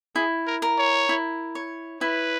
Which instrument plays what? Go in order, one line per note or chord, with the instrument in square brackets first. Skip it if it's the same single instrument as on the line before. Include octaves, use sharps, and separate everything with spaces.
[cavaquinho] E4 [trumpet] G#4
[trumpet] A#4
[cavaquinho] A#4
[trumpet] C#5
[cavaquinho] E4
C#5
[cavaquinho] E4 [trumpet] B4